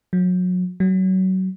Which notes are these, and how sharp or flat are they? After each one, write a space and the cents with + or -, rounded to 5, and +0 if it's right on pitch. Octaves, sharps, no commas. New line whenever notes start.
F#3 -30
F#3 +25